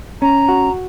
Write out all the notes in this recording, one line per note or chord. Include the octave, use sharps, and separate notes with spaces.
C#4 A#5
F#4